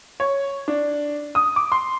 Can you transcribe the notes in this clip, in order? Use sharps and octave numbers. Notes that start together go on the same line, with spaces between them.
C#5
D4
D#6
D6
C6